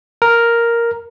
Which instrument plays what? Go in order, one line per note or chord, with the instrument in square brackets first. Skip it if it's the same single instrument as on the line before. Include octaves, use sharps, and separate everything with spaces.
[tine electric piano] A#4